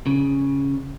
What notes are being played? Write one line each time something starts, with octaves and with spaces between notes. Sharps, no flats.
C#3